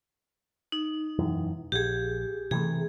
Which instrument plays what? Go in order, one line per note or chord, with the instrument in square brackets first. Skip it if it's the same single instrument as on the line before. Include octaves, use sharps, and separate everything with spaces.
[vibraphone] D#4
[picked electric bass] E1 F#2 E3
[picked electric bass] A#1 [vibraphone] G4 G#4
[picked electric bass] C3 E3 A3 [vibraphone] G#4